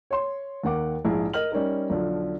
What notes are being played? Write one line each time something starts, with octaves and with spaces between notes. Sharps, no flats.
C#5 C6
D#2 D#3 F#5 D6
A#1 G#2 E4 G#4
A#4 D#5 F6 F#7
G3 C#4 D#4 A#4
B1 D3 F3